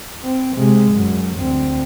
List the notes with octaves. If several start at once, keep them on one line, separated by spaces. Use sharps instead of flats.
C4
C3 G#3
F#2
D2 C4